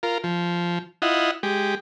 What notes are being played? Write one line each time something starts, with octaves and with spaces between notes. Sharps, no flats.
F4 A#4
F3
E4 F4 D#5 F#5
G#3 G4